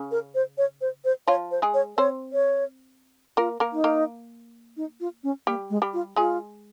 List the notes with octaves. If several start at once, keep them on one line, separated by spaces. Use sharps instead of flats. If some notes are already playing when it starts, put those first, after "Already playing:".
Already playing: C#3 C#4
A#4
C5
C#5
C5
C5
F3 F4 C#5
C5
G#3 G#4
C#5
C4 C5 C#5
C#5
A#3 F4 A#4
A#3 A#4
D#4
A#3 A#4
D#4
F4
C#4
G3 A#3 G4
G#3
G3 G4
F4
G#3 F4 G#4